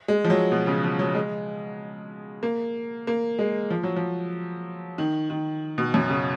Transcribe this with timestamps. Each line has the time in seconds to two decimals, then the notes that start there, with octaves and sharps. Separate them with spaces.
0.08 G#3
0.25 F3
0.30 F#3
0.52 B2
0.67 C#3
0.84 F3
0.99 F#3
1.15 G#3
2.43 A#3
3.07 A#3
3.39 G#3
3.71 F3
3.84 F#3
3.96 F3
4.98 D#3
5.30 D#3
5.78 B2
5.94 F#2
6.10 C#3